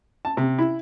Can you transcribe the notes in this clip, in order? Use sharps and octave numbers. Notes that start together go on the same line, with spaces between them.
A5
C3
E4